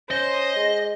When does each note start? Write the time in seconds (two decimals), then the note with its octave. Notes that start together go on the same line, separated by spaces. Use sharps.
0.11 C#4 C5 D#5
0.56 G#3